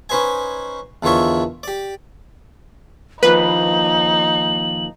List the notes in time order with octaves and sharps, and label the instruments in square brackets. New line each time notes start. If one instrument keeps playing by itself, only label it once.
[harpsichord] C#4 D#4 B4 C5 D#5 G#5
E2 D3 D#3 F4 C#5 E5
G4 D5
[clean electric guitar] D#2 F3 A#3 [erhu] D#4 [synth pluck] B4 [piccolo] F#7